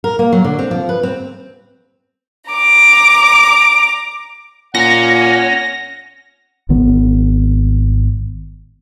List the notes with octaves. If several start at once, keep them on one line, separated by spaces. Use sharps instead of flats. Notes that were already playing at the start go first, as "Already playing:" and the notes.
A#4
A#3
F#3
D3
C4
F3
B4
C4
A#5 D6
A#2 C#4 F#5 A#6
G#1 G#2 D#3 B3